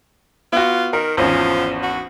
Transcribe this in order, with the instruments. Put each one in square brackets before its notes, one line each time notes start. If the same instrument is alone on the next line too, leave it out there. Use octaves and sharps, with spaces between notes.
[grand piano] B3 F#4 [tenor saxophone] F4
[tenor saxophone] D#3 [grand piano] A#4
[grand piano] G#1 E2 C#4 [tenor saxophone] F3
[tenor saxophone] F#4